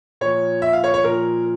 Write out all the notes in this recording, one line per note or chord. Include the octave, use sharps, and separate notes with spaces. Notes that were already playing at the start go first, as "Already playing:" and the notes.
A#2 F3 C#5
E5
F5
C#5
C#5
A#2 F3 A#4